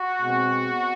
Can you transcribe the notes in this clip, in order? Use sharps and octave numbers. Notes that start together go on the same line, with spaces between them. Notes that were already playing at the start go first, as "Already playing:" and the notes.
Already playing: F#4
B2 G#3 C4